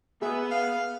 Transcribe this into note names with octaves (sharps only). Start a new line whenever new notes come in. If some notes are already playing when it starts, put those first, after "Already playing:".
B3 G#4 E5
F5